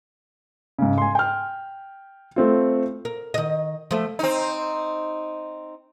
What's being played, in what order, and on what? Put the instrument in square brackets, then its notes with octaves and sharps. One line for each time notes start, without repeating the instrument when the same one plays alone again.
[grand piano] G#2 C#3
G#5 C6
G5 F6
A3 C4 F4
[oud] A#4
D#3 D#5
F3 A3
[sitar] C4 D#4